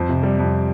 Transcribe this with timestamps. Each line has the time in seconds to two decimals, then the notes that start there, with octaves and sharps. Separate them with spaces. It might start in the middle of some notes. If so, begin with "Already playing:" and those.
Already playing: F2 C5
0.09 C3
0.23 G3
0.39 F2